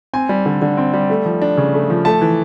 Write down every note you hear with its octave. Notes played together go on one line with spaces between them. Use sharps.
C4 G#5
G3
D3
D3
C4
G3
A3
F3
D4
C#3
A3
F3
A3 A5
E3